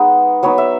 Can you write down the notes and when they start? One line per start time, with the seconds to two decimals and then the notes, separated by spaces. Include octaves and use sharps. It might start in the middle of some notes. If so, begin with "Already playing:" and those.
Already playing: G#3 B3 D#4
0.43 F#3 B3 D#4 C#5
0.58 E5